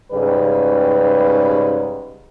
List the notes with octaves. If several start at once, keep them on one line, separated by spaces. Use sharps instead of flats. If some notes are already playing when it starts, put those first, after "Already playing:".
G#2 C#3 G3 B4